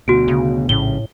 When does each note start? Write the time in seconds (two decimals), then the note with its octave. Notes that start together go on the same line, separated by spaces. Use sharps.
0.08 D2 B2 F#4 D7
0.28 C#3
0.69 A#1 A2 C#3 G7